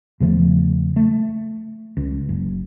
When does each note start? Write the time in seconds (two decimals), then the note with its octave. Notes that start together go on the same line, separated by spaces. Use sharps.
0.20 E2 C#3 F3 A3
0.96 A3
1.97 C#2
2.29 F#1